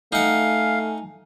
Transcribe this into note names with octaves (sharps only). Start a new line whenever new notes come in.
A3 D#4 F5 F#5 G#5